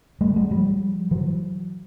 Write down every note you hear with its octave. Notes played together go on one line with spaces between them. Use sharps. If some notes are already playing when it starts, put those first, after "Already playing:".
G3 A3
F#3 G#3
F3 G3
E3 F#3